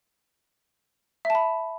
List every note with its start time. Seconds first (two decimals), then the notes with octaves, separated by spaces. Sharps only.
1.25 E5
1.30 A5
1.35 B5